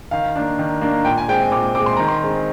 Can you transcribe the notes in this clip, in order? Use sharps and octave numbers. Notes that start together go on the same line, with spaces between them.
D#3 F5
A#3 D4
D#3
A#3 D4
A#2 G5
G#5
G#3 C4 G5
G#5
A#2 D6
G#3 C4 D6
C6
D#3 A#5
C6
G#3 C4